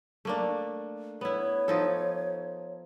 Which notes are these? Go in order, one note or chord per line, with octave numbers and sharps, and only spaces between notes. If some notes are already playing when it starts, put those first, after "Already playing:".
A3 A#3 D4
B3 E4 C#5
F3 D#4 A4